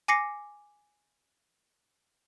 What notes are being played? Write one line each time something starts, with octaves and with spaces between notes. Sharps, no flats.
G#5 D6 A#6 C7 C#7